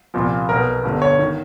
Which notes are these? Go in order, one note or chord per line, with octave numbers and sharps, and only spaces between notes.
C2 A#2 F3
B1 B2 A#4
G1 G2 D3
C#5
D#3